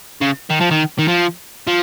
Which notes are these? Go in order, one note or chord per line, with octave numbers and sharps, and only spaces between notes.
C#3
D#3
F3
D#3
D#3
F3
F3